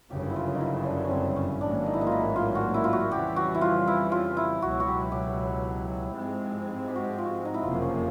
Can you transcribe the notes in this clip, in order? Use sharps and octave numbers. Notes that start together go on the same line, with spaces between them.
G1 F#2 C#3 G4
E4
F4
D#4
E4
D4
C#4
C4
C#4
A1 G#2 D#3 F#3 A#3 D4
D#4
E4
D#4
E4 F4
F4
F#4
E4
F4
F#4
F2 C#3 E3 G3 G4
F#4
E4
F4
E4
F4
E4
C#2 B2 F#3 F#4
F#4
G4
G4
G#2 F3 G#3 C4
G4
F#4
G4
F4
F#4
D#4
E4
F#1 F2 C3 F3 A#3 F4
C#4